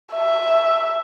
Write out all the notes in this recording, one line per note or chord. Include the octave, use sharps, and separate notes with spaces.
E5